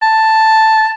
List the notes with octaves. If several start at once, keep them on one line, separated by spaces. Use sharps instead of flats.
A5